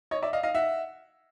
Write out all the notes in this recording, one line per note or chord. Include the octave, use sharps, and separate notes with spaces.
C#5 D#5
D5 E5
D#5 F5
D#5 F5
E5 F#5